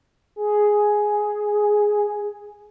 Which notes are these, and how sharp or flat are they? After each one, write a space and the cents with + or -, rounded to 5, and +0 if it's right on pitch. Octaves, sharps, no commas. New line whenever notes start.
G#4 +5